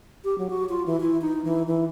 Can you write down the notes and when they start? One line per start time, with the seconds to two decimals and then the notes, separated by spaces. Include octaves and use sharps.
0.24 G4
0.38 F#3
0.50 F#4
0.69 F4
0.86 E3
1.00 E4
1.21 D#4
1.44 E3
1.67 E3